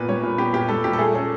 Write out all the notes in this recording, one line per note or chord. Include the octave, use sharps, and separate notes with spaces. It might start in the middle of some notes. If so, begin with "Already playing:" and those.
Already playing: A#2 B3 B4
G3 C#5
A#2
B3 G4
A#2 G4
G3 A4
A#2 G4
A4
A3 G#4
C#4 A4